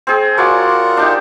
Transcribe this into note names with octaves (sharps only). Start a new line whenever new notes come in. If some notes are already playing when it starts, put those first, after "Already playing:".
C4 G#4
F#3 F4 A#4 D5 F#5
D4 D#4 G4